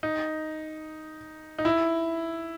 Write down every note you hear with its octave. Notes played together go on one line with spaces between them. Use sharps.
D#4
D#4
E4